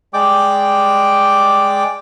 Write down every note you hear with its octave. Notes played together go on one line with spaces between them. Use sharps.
G#3 D5 G5 D6